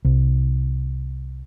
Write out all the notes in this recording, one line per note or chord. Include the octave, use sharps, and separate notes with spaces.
C2